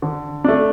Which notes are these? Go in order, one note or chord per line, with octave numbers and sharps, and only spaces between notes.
D3
A3 D4